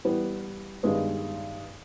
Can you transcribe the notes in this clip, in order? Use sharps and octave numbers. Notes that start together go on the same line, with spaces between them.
E3 G3 B3
G2 D#3 G#3 B3